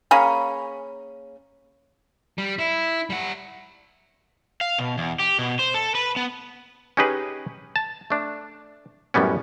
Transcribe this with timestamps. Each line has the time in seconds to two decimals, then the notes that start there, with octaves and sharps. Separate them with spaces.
0.11 A#3 C#4 G#4 B5
2.38 G3
2.59 E4
3.10 G3 F#5
4.61 F5
4.78 B2
4.98 E2
5.19 G4
5.39 B2
5.59 C5
5.74 A4
5.95 B4
6.16 B3
6.97 C#4 D#4 G4 G#4 B4
7.76 A5
8.10 A3 D4
9.14 F#2 A2 G3 B3 C#4